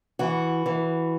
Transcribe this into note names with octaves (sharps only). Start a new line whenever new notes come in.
E3 F#4
E3